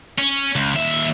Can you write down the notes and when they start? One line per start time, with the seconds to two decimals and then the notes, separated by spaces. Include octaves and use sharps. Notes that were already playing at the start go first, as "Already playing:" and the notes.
0.18 C#4
0.55 C#2
0.75 D#2 E5